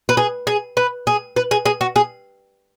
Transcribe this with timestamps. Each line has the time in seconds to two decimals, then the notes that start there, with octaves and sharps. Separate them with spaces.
0.09 B4
0.17 G#4
0.47 G#4
0.77 B4
1.07 G#4
1.36 B4
1.51 G#4
1.66 G#4
1.81 F#4
1.96 G#4